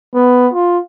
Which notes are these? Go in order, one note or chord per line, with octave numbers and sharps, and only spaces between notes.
B3
F4